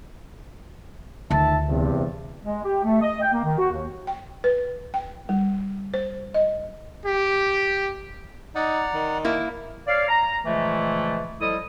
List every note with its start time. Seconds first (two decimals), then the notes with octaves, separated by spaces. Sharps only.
1.31 D2 D#3 F4 E5 A5
1.68 E2 G2 C3
2.44 G#3
2.65 G4
2.84 A3
3.01 D#5
3.21 G5
3.33 A#3
3.44 D#3
3.58 F#4
3.72 D#2
4.07 G5
4.44 B4
4.94 G5
5.29 G3
5.94 C5
6.34 D#5
7.04 G4
8.55 D#4 D5 F#5 A#5
8.94 D#3
9.25 A#3 E4
9.88 C#5 D5 F5
10.09 A#5
10.46 A#2 C#3 E3 F3 G#3 A3
11.41 F3 G3 E4 A4 D#5 D#6